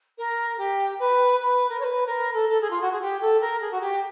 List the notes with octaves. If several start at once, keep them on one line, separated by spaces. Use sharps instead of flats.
A#4
G4
B4
B4
A#4
C#5
B4
A#4
A4
A4
G#4
F4
F#4
G#4
G4
A4
A#4
G#4
F#4
G4